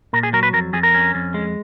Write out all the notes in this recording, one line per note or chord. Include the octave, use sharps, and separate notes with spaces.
A#2 A#4
G#4
F#3 A#4
B4
F2 A#4
F2 G#4
A#4
C#4
F2
G#3